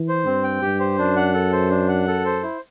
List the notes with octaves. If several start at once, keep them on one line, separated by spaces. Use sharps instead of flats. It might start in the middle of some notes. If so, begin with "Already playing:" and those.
Already playing: E3
C5
G2 C4
G5
G2 G4
C5
F#2 D4
F#5
A4
C5
D4
F#5
A4
C5
E4